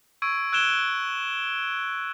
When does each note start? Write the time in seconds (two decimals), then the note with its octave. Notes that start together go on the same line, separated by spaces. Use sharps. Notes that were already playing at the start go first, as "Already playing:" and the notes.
0.22 C#6 E6 G#6 D7
0.52 E6 F#6 G#6 D7 E7 G7